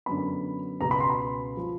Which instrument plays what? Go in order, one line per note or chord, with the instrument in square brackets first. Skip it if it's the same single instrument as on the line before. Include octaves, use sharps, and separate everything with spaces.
[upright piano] F#2 D3 F#3 B3 B5
C#2 B2 G#3 B3 A#5
B5
C6
B5
F3